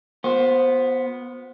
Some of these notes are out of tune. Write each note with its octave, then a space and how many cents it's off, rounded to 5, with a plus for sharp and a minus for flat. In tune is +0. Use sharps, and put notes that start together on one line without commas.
B3 +0 F4 +45 C5 +0